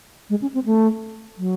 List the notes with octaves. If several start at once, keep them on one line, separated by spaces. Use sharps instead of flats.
G#3
C#4
C4
A3
F#3